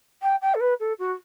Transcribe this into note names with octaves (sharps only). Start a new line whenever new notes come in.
G5
G5
A4
B4
A4
F#4